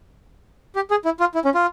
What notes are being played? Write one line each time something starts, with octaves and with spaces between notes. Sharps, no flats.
G4
G#4
E4
F4
E4
C#4
F4